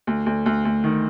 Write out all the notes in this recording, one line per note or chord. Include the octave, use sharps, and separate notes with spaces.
D2
D2
D2
D2
D#3